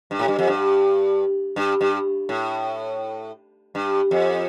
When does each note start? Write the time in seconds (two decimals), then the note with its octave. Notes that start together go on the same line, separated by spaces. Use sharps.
0.11 G2
0.19 A2
0.28 G2
0.39 F2
0.47 G2
1.56 G2
1.81 G2
2.29 A2
3.75 G2
4.11 F2